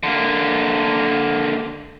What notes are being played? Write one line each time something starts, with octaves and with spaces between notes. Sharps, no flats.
D3 A#3